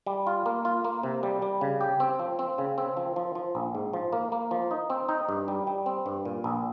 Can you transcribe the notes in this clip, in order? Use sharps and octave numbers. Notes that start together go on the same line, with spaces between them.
G3
F4
A#3
F4
A#3
C3
G3
G3
C#3
G4
C4
F3
C4
C#3
C4
F3
F3
F3
A#1
G#2
F3
A#3
A#3
F3
D#4
C4
D#4
G2
G3
G3
C4
G2
A#2
A#1